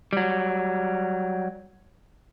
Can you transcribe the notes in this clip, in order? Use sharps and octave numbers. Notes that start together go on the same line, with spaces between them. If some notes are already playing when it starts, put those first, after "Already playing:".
F#3 G3